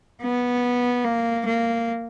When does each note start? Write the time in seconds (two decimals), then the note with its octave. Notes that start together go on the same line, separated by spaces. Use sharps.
0.22 B3
1.05 A#3
1.46 A#3